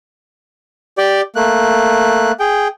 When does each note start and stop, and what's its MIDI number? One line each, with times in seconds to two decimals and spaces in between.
0.98 1.21 67
0.98 1.21 74
0.98 1.21 79
1.36 2.32 57
1.36 2.32 58
1.36 2.32 90
2.40 2.68 68
2.40 2.68 79